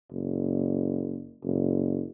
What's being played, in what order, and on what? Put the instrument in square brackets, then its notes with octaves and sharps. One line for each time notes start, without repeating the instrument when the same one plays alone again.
[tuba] F#1
F#1